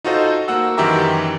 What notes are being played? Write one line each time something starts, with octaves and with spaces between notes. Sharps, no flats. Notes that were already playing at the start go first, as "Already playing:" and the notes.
D#4 F4 F#4 A4 C5 D#5
A#3 F#4 F#5 E6
F#2 D#3 E3 G4 E5 A#5